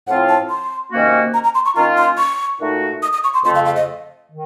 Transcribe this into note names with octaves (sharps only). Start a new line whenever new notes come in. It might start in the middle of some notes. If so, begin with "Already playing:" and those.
A2 F3 C4 F4 F#5
A5
C6
C3 D#3 A#3 C#4 F#4
A#5
A#5
C6
C#6
D#3 A#3 C#4 F4 A#5
C6
C#6
A#2 A3 D#4 F#4
D#6
D#6
C#6
C6
F2 C#3 A3 C6
F5
F5
D#5
D#3